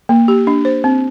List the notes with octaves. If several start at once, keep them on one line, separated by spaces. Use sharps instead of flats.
A#3
G4
D4
C5
C4